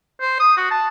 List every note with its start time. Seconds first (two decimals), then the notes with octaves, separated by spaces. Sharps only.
0.21 C5
0.40 D#6
0.57 F#4
0.71 A5